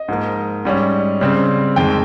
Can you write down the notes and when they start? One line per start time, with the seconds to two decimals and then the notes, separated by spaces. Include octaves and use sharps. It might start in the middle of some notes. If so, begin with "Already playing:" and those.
Already playing: D#5
0.08 G#2 F3 A#3
0.65 G#2 G3 C#4
1.21 C#3 G3 C4
1.76 F2 D#3 G#3 G5